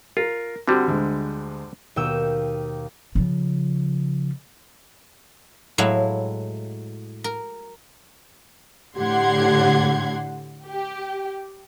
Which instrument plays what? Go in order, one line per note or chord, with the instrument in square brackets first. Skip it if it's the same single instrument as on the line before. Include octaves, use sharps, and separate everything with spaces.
[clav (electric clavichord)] F4 [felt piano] A#4
[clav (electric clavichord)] D3 G3 [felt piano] C4 F#4 G4
[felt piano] D2 G#3
[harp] D#2 B2 G5 E6
[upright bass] C#3 F3
[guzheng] A2 F#3 G#3 E4 F5
A#4
[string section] A2 D3 G4 F#5 C6 G#6
G4